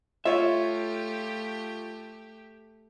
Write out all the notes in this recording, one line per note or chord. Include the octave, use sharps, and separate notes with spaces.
A3 F4 G4 C#5 E5